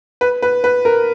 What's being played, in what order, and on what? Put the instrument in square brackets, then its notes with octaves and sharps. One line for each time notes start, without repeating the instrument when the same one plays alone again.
[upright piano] B4
B4
B4
A#4